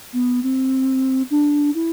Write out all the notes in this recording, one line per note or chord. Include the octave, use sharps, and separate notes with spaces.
B3
C4
D4
E4